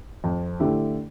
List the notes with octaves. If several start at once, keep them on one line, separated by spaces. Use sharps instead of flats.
F2
D3 A3 E4 G4